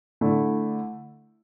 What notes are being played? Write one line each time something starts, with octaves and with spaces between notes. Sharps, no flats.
D3 A3 E4